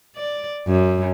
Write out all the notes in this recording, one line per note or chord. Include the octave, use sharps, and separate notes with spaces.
D5
F#2